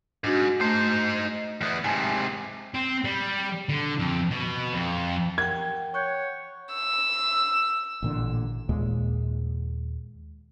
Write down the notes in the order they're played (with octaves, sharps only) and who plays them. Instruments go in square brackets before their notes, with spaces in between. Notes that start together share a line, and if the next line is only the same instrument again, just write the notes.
[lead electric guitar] G#2 [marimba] D4 F#4
[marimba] A3 [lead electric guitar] D#4 C5
[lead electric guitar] E2 B3
[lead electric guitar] G#2 C3 [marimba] G#5 A5
[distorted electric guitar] C4
G3
D3
F2
B2
F2
[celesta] A#4 [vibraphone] F#5 G5 [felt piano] G#6
[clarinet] C#5 [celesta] C#6 F#6 G6
[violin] E6
[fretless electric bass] A1 A#2 D3
D#2 A#2 G#3